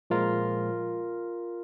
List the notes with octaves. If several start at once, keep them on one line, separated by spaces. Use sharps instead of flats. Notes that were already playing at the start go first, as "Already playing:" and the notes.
A#2 F3 G#3 F4 A#4